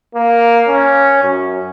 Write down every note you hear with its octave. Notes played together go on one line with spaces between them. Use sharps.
A#3
C#4
F#2